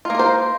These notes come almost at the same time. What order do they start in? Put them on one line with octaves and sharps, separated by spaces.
F4 A#3 A#4 C5